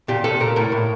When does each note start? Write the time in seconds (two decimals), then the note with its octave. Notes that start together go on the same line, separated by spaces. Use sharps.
0.08 A#2 G4
0.24 A#2 A4
0.40 A#2 A#4
0.56 A2 A#4
0.72 A2